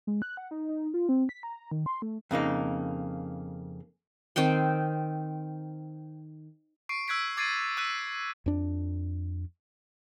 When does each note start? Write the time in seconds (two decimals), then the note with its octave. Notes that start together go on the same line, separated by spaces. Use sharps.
0.07 G#3
0.22 F#6
0.37 F#5
0.51 D#4
0.69 D#4
0.94 F4
1.09 C4
1.29 B6
1.43 A#5
1.71 D#3
1.86 C6
2.02 A3
2.31 F2 C#3 A#3 D#4
4.36 D#3 C4 G5 C6
6.89 C#6 C7 D7
7.08 E6 F#6 G#6 B6 D7
7.37 D6 G#6 A6 C7 D7 D#7
7.77 E6 F#6 B6 D#7
8.46 F2 D4